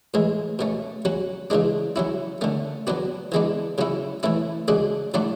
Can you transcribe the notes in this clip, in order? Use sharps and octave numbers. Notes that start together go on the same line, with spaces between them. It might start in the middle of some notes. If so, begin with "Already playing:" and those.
A2 E3 G#3
B2 A3 C#4
F#3 C#4 F#4
C#3 E3 G#3 D4
F#3 C#4 E4
D3 A3 C#4
F#3 B3 D4 F#4
E3 G#3 B3 D4
C#3 F#3 C#4 E4
E3 A3 C#4 E4
C#3 G#3 D4 F#4
A2 F#3 A3 D4 F#4